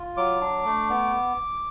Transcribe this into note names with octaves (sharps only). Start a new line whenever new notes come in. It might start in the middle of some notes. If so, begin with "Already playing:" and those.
Already playing: F4
F#3 D6
D4
A3
B3